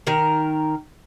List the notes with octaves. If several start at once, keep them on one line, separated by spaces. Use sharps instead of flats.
D#3 A#4